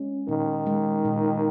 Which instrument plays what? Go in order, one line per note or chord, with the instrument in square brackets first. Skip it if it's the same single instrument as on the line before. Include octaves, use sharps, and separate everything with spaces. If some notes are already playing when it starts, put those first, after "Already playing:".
Already playing: [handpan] G#3 C#4
[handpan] A#2 [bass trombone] D#3
[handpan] G#3
A#2